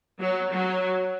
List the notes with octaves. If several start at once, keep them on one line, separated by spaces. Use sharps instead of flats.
F#3
F#3